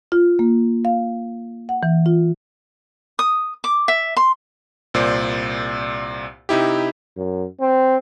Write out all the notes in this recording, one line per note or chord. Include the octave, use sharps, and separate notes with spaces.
F4
A#3
F5
F#5
E3
F4
D#6
D6
E5
C6
C2 A#2 C5 D5
C3 D#4 E4 G4
F#2
C4